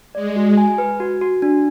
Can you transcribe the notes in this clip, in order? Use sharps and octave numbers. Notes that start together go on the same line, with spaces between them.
G#3 D5
F#4
G#5
B4
F#4
F#4
D4